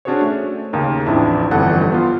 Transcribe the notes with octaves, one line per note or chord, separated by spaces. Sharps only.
C#4 D4 F#4 G#4 C5 C#5
A3
D#2 C#3 A#3 D#4
A1 F2 D4 E4
G1 F2 E3 G3 A4 F#5
B3 F4